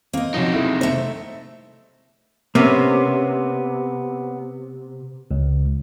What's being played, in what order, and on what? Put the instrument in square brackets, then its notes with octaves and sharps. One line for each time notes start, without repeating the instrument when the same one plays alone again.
[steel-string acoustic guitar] A#3 D#5 [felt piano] C4
[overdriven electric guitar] C3 D#4 [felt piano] F3 F#3 C#4
[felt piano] E4 G#4
[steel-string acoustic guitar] A3 E5 [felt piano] C5
[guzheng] C3 [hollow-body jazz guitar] A#3 B3 C#4
[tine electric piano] C#2